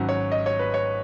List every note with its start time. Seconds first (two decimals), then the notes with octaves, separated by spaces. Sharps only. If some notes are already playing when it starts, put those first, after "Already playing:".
Already playing: G#1 G#2 F#3 C#4 F#5
0.09 C#5
0.32 D#5
0.46 C#5
0.59 B4
0.74 C#5